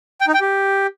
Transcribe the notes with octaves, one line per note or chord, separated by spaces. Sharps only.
G5
D#4
G5
G4